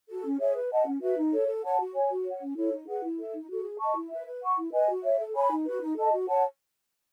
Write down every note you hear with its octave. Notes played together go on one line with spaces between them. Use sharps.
F#4 A4
C#4
G#4 C#5 E5
B4
D#5 F#5 A5
C#4
F#4 B4 E5
D#4
A4 C#5
A4
C#5 F#5 A5
F#4
C#5 G#5
F#4
C#5
F#5
C#4
E4 A4 C#5
D#4
G#4 B4 F#5
E4
A4 E5
D#4
F#4 A4
G#4
D#5 A5 C#6
E4
B4 E5
B4
F#5 C#6
E4
B4 D#5 G#5
F#4
C#5 E5
A4
C#5 G#5 B5
D#4
F#4 B4
D#4
A4 D#5 A5
F#4
C#5 F#5 A5